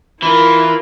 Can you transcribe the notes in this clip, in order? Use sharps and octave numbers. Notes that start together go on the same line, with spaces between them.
E3 E4 F4 A#4